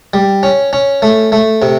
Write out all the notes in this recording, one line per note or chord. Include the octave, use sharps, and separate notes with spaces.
G3
C#4
C#4
A3
A3
C3